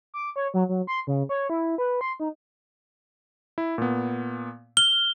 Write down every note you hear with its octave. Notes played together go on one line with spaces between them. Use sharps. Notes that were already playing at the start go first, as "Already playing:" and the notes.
D6
C#5
F#3
F#3
C6
C#3
C#5
E4
B4
C6
D#4
E4
A#2 B3
F6 G7